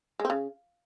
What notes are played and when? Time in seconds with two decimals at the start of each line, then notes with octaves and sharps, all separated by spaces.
0.20 G#3
0.25 C4
0.30 C#3